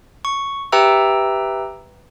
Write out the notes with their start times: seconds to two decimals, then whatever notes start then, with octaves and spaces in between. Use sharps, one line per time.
0.25 C#6
0.72 G4 B4 E5 G5 A#5 E6